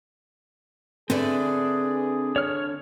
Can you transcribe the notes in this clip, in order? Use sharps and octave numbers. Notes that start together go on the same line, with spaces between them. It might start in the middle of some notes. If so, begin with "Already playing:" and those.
D3 A3 C4 D4 G#4 B4 D5
C#5 F6